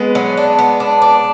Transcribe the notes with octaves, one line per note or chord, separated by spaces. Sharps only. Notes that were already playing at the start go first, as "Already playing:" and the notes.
Already playing: G#3 B3
F#3
D4
B3
D4
D4